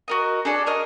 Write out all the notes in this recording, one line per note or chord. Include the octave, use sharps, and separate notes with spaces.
F#4 A#4 D#5
D4 G#4 A4 D5
F#4 A#4 D#5 F6